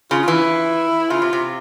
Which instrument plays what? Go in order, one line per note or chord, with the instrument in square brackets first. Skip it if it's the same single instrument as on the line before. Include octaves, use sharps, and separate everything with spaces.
[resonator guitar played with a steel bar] C#3 [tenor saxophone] F4
[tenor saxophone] F4
[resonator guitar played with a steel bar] E3
[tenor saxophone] E4
[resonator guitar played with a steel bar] C#3 [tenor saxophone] F4
[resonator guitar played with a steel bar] C3
C3